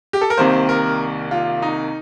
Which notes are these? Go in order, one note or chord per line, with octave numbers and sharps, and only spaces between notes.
G4
A4
A#4
C2 C3 D#3 A#3 C5
A#4
F4
D#4